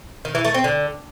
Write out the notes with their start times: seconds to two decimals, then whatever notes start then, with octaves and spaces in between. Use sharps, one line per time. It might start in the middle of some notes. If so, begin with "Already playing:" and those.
0.25 D#3
0.35 E3
0.45 A3
0.54 C4
0.64 D3